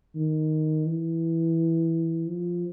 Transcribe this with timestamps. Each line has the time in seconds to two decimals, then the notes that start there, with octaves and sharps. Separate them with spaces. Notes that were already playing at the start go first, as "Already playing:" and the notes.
0.16 D#3
0.86 E3
2.28 F3